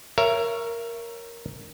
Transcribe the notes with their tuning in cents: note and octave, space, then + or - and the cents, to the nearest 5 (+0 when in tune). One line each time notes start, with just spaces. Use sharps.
A#4 +0 C#5 +0 E5 +35